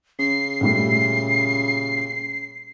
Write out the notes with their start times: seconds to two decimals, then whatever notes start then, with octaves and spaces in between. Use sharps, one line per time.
0.19 C#3 C7
0.61 A#2 G3 A3